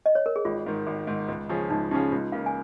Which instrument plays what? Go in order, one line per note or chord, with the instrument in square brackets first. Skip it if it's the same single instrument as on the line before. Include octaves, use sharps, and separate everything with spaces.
[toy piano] D#5
C#5
A#4
G#4
[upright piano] G#1 [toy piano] F4
[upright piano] G#2 D#3
G#1
G#2 D#3
C#2
C#3 F3 C#4 G#4
[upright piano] C#2 [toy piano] D#4
[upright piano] C#3 F3 C#4 G#4 [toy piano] D#4
[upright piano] C#2 [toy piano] F4
[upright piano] C#3 A#3 [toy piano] F5
[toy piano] G#5